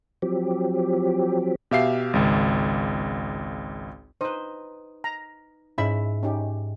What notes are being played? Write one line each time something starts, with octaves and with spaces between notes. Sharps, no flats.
F3 F#3 C4 G4
B2 G4 E5 F5 C7
G#1 C#2
D#4 B4 C5
A#5
G#2 C#4 E4 E5 B5
C#4 D#4 G4